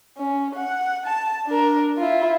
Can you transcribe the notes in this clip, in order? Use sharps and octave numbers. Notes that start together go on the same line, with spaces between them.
C#4
F#5
A5
D4 A#4
E4 F4